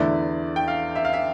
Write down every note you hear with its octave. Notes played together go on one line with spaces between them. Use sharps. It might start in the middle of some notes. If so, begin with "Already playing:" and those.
Already playing: E2 D3 A3 E4 D5
G5
F5
E5
F5
E5